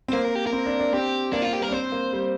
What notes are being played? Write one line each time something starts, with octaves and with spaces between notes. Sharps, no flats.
C4
A#3 C5
A#4
G4
A#4
C4
D4
D4
C4 G4
A#3 D4
C4 F4
G4
G3 A#4
D4
C4 C5
A#3
G3